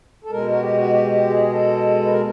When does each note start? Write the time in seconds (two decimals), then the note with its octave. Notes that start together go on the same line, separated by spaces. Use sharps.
0.24 A4
0.31 B2 G#3 A#4
0.49 F#4
0.60 G4
0.76 F#4
0.91 G4
1.11 G4
1.30 G#4
1.50 A4
2.05 B4
2.10 A#4